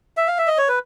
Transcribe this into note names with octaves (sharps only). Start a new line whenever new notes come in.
E5
F5
E5
D#5
C#5
B4